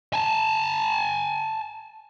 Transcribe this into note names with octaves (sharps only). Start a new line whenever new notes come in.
G#5 A5